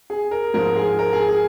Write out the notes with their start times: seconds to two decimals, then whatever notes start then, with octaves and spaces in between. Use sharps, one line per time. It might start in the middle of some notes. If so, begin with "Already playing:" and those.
0.10 G#4
0.31 A#4
0.54 G#2 F3 G#3 A#4
0.76 G#4
0.99 A#4
1.13 G#4
1.28 G#4